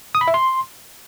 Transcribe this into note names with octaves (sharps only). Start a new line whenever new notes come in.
D#6
B5
E5
C6